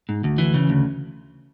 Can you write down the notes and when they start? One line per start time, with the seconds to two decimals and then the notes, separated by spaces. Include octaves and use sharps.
0.09 G#2
0.24 D2
0.38 E3
0.54 C#3
0.69 D2